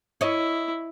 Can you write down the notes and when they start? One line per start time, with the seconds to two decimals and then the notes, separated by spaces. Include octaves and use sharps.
0.21 E4 C#5 D#5